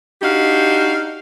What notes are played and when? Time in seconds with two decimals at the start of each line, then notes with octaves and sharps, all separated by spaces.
0.22 D4 D#4 F#4 G4 F5